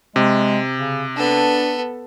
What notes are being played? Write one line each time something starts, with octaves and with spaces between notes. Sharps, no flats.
C3 G#3
C#3
B3 D4 A4